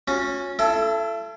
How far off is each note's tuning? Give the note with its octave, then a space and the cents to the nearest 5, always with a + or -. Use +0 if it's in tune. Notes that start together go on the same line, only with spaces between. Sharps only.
C#4 +0 F#4 -45
E4 +40 A4 +0